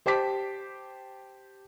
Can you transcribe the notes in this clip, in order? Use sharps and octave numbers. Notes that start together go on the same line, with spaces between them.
G4 C5 G5 A5 D6 B6